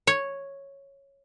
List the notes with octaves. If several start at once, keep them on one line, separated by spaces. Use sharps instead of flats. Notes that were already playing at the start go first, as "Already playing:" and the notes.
C#5